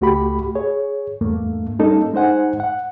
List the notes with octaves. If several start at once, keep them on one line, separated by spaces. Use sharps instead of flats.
C#2 A3 F#4 G4 B5
G#4 C#5
E2 G2 A3 A#3
G3 A#3 C#4 D#4 A4
G#3 D#4 C5 F#5 G#5
F#5